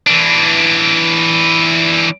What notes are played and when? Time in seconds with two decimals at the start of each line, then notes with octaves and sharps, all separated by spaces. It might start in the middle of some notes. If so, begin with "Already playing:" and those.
0.07 E3 D4